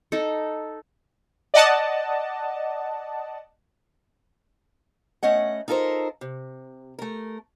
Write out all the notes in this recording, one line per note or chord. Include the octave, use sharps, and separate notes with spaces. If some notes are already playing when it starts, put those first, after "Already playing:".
D#4 A4
D5 D#5 F#5 A5
A3 B3 C#4 D#5 F#5
D#4 F4 A4 A#4 C5
C3
A3 A#4